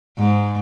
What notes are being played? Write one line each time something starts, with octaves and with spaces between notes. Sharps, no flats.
G#2